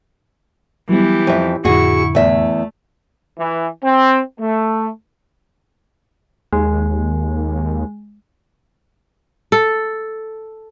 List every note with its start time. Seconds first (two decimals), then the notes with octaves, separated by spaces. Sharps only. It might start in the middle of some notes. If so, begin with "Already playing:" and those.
0.89 E3 F#3 G3 B3 G4
1.27 F2 E5
1.65 F2 A2 D3 E4 F#4 G#4 C#6
2.15 E2 A3 E5
3.38 E3
3.83 C4
4.40 A3
6.53 D#2 G#3
9.52 A4